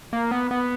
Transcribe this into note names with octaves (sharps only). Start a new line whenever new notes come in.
A#3
B3
B3